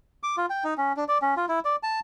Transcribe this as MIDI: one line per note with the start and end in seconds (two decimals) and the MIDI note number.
0.23 0.36 86
0.37 0.46 65
0.50 0.64 79
0.64 0.74 63
0.78 0.92 61
0.97 1.04 62
1.08 1.18 74
1.22 1.34 61
1.37 1.46 65
1.49 1.59 64
1.65 1.76 74
1.83 2.00 81